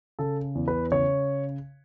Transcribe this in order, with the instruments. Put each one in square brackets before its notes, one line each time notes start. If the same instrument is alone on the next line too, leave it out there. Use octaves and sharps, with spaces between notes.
[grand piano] C#3 A4
E2
B4
C#3 C#5